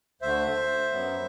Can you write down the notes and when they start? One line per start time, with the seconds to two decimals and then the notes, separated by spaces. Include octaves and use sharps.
0.22 D2 D3 A3 C5 E5
0.92 F#2 F#3 B3